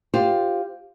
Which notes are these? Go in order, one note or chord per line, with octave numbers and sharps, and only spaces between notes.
F4 G4 C5